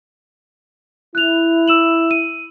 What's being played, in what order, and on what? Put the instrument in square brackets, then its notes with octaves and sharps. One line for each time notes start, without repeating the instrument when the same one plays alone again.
[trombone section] E4 [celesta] F#6 F7
[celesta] E6 E7 F#7
D#7